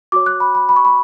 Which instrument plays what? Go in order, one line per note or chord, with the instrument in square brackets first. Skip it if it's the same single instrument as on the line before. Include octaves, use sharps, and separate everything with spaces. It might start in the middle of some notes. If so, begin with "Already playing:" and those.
[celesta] F#4 C#5 D6
F#6
B5
B5
B5
C#6
B5